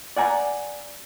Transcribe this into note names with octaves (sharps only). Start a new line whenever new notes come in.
D5 F#5 G#5 A#5